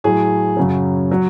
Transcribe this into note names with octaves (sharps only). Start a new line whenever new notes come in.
A2 F#3 G#4
F#2 C#3 F#3
F#3